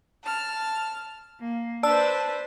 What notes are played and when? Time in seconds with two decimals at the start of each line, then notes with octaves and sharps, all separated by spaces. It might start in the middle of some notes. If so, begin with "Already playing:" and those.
0.24 A5 F6
1.40 A#3
1.83 D4 B4 C5 D5 A5 E6